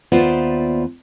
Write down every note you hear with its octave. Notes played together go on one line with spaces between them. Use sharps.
D#2 B3 F4 C5 D5 E5